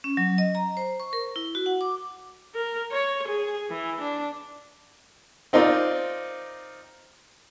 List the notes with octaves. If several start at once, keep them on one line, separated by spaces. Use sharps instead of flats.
C#4
F#3
D#5
A#5
C5
C#6
A#4
E4
F#4
F#5
D6
A#4
C#5
G#4
E3
D4
C4 D#4 F4 A#4 D5